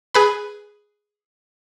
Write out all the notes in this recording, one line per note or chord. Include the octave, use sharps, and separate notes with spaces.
G#4 B4 B5